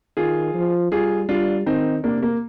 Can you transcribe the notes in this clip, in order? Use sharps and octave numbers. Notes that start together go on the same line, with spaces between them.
D#3 F4 G#4
F3
G3 F4 G#4
G3 D4 F4
D#3 C4 D#4
C3 A#3 D4
A#3